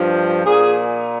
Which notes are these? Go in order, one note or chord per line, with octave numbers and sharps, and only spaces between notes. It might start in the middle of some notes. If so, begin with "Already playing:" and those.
Already playing: G2 F3
A#2 G#4